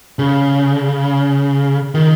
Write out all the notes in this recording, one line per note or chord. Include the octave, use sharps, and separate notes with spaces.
C#3
D#3